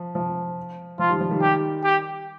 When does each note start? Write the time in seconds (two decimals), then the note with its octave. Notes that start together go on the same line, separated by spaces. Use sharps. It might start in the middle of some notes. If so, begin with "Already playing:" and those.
Already playing: F3
0.15 F3
0.99 F3 F4
1.09 D#3 G3
1.20 F3
1.31 D#3 G3
1.41 G4
1.84 G4